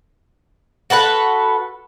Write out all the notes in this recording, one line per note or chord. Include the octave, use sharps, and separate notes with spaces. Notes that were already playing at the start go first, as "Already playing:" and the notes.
F#4 A4 B4 F#5